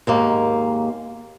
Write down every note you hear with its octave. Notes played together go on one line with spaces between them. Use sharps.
D#2 G#2 A#3